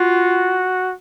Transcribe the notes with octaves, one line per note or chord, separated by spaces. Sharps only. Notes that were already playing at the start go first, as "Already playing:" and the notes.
Already playing: F4 F#4